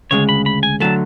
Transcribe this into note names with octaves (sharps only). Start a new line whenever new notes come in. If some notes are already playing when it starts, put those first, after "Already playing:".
D2 C#3 G#3 C#5
B5
B5
G#5
D3 F#3 A3 A5